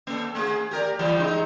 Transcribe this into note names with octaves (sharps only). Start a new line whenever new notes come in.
A#3 A4
A3 G#4
G4 A#4 D5
E3 G3 A#3
G#3 D#4